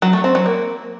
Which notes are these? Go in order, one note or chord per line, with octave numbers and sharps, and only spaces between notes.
F#3
A3
C4
F#3
A#3